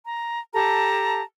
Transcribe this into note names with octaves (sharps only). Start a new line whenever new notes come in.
A#5
G4 A4 A5 A#5